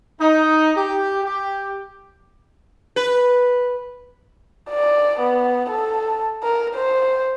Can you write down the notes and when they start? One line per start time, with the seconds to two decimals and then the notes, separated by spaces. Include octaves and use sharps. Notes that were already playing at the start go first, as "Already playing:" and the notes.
0.20 D#4
0.76 G4
1.24 G4
2.96 B4
4.70 D5
5.20 B3
5.70 A4
6.43 A#4
6.75 C5